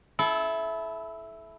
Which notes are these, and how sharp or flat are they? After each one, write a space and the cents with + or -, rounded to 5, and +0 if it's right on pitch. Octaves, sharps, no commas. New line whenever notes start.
E4 +0 A4 -30